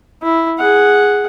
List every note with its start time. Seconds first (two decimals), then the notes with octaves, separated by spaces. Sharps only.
0.22 E4
0.59 G#4 F#5